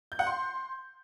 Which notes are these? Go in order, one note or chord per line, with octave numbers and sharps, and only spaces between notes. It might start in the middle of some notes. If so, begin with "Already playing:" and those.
G6
F#5
C6